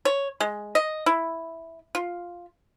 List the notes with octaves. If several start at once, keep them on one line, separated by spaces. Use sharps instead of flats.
C#5
G#3
D#5
E4
F4